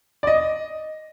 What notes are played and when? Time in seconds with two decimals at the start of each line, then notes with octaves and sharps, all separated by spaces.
0.23 D5
0.27 D#5